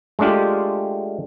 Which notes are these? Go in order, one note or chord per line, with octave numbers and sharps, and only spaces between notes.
G#3 A3 D4 F4 G4